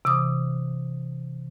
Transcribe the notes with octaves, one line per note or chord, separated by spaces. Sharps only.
C3 E3 D6 D#6